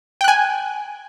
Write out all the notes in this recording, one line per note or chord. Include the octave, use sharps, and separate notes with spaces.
G5 G#5 F#6